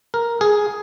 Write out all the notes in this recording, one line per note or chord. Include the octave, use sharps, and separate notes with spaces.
A#4
G#4